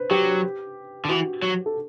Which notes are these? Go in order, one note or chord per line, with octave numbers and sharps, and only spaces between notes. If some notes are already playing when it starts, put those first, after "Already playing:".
Already playing: B4 C5
F#3 G4
D3
E3 F#4
F#3
A4